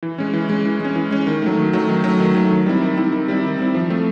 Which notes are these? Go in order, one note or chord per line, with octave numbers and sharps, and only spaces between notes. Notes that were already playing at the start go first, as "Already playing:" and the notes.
E3
G#3 C#4
E3
G#3 C#4
E3
G#3 C#4
E3
G#3 C#4
D#3
F#3 A3
D#3
F#3 A3
D#3
F#3 A3
D#3
F#3 A3
D#3
G3 C4 E4
D#3
G3 C4 E4
D#3
G3 C4 E4
D#3
G3 C4 E4
F3
A3 C4